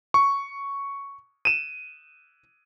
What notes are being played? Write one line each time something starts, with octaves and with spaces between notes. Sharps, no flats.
C#6
D#7 E7